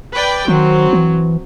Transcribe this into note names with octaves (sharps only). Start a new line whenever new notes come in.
B4 D5 G5
D#3 F#3 C4
E3